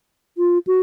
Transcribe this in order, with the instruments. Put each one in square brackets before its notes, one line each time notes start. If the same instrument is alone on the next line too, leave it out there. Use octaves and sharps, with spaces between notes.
[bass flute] F4
F#4